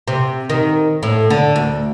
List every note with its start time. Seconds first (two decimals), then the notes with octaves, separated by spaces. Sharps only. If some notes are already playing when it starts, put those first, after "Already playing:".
0.08 C3
0.49 D#3
1.03 A2
1.30 D3
1.56 D2